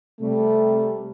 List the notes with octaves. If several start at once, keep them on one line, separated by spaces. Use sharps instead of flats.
C3 G3 A3